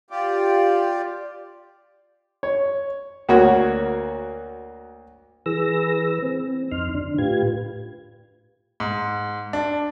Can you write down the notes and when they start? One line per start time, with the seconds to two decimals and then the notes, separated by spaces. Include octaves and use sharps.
0.10 F4 G4 D5
2.43 C#5
3.29 D2 A#3 F#4 C#5
5.46 E3 G#4 B4 E6 A#6
6.22 C4
6.71 F2 D#4 C6 F6
6.95 D3 D4
7.18 A2 F4 G4 B4 G#6
8.80 G#2
9.53 D4